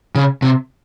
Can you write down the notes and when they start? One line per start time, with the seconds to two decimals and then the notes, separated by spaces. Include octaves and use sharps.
0.15 C#3
0.42 C3